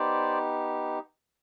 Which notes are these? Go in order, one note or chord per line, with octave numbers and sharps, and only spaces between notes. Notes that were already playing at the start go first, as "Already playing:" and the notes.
Already playing: B3 D#4 G4 C5 D5